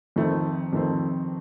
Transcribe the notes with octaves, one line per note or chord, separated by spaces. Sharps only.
F2 D#3 A3 C4
F2 D#3 A3 C4